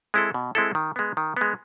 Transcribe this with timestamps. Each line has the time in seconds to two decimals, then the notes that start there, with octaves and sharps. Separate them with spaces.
0.14 G#3 C4 E4 A4
0.34 B2
0.55 G#3 C4 E4 A4
0.75 D#3
0.96 G#3 B3
1.17 D#3
1.37 G#3 B3